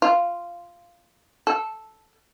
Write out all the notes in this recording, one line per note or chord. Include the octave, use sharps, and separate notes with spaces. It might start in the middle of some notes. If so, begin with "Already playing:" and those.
F4
A4